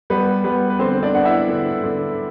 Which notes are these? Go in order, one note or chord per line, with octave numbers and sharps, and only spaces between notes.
G3 B3 B4
G3 B3 B4
B4
D3 C4 C5
D4 D5
B3 F#5
E4 E5
D3
D3